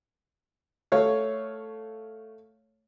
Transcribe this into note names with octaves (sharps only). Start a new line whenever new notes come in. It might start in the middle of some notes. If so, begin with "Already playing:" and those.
A3 C#5 F5